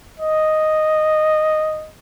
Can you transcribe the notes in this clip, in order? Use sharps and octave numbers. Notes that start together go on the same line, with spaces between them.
D#5